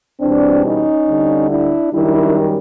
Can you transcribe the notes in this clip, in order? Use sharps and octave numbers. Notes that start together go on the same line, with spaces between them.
E2 B2 G3 C4 D4
C#4 D#4
D2 D3 G3
D4 E4
F#2 D#3 G3 D4 E4